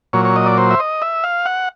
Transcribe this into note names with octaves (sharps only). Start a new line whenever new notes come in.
A#2 F#3 C#5
C#5
D#5
D5
C5
E5
D#5
E5
F5
F#5